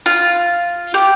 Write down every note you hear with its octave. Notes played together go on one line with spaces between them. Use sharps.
F4
G4